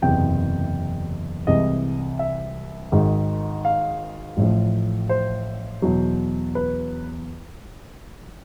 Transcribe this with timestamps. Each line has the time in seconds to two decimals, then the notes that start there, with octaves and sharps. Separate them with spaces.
0.02 F#1 E2 C3 G5
1.47 C2 C3 E3 G#3 D#5
2.19 E5
2.92 G#1 G#2 D#3 G#3
3.65 F5
4.37 A1 A2 F3
5.09 C5
5.82 E2 B2 F#3
6.55 B4